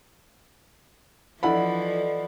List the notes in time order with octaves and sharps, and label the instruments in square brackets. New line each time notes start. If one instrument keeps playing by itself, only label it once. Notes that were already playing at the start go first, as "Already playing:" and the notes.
[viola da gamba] E3 F3 [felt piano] E4 F#5 B5 [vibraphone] A4 D5 D#5